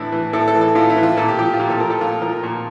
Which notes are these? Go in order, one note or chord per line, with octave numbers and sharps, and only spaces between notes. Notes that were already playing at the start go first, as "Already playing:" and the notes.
Already playing: A2 E3 D4 E4
E3
A2 A4
A4
E3
A4
A2 F4
E4
E3
F4
A#2 A4
G4
F3 G4
F4
A#2 G4
A4
F3 A#4
A4
A#2 F4
F3 A#4
A#4
A#2